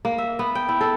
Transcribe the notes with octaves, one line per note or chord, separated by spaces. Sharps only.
A#3
E5
B3
G5
E4
A4